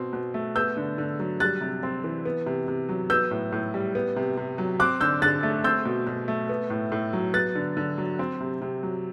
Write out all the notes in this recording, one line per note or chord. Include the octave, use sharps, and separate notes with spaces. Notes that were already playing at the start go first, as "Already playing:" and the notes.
Already playing: B2 C4
B2
A3
B3 E6 G6
D3
D3
F#3
G3 F#6 A6
C3
C4
E3
B3
C3
C3
F#3
B3 E6 G6
A2
A2
G3
B3
C3
C3
F#3
C4 D6 F#6
D3 E6 G6
D3 F#6 A6
A3
C4 E6 G6
B2
B2
A3
B3
A2
A2
F#3
B3 F#6 A6
D3
D3
F#3
C4
C3
C3
F#3